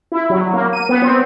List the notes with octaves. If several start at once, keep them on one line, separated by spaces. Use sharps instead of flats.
E4
F#3
A#3
D#7
B3
C4